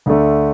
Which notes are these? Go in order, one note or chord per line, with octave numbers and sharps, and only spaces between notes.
D2 D3 A3